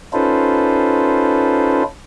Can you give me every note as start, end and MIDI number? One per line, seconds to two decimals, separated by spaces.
0.13 1.83 61
0.13 1.83 63
0.13 1.83 65
0.13 1.83 69
0.13 1.83 71
0.13 1.83 72